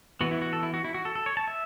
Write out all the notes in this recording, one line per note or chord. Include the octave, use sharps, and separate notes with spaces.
E3 B3 F#4
E4
F#4
A4
E4
F#4
E4
F#4
A4
A4
C#5
A5
E5